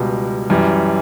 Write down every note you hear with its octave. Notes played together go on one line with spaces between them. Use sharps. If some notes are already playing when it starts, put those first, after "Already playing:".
Already playing: C#2 B2 G3
F#2 E3 G3